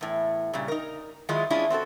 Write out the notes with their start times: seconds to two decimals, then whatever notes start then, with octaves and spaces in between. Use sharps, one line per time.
0.01 E2 A2
0.53 A#2 C#3 G3
0.68 D#4 A#4
1.29 D#3 F#3 G#3 E4 F4
1.50 G#3 C#4 D4 E4 F4 G#4
1.70 C4 F#4 G4 A4